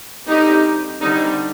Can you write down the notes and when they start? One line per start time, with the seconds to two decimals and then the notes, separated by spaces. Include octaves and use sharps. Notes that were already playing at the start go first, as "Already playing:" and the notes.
0.26 D3 G3 C4 D#4 G4
1.00 D3 G3 C4 D#4